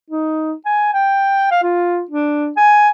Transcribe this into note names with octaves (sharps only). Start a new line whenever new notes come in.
D#4
G#5
G5
F5
F4
D4
G#5